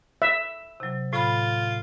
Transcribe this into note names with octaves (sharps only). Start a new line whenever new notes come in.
E5
C3 F#3
A2 F4 B5